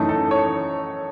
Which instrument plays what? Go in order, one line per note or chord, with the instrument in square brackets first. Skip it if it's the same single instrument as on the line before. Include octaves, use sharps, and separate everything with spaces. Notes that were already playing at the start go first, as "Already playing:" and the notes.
Already playing: [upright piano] F#2 E3 A3 D#4
A4
C#5